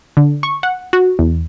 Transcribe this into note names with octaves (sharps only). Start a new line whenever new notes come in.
D3
C#6
F#5
F#4
E2